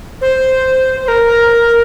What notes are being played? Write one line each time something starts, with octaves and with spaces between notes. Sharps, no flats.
C5
C5
A#4